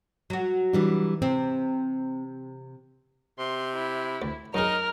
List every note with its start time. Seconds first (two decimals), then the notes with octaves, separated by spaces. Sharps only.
0.30 F#3 F#4
0.73 E3 G3 D4
1.22 C3 C4
3.39 C3 C6
3.75 E4
4.22 D2
4.54 F#2 D#4 G#4 A#4 F6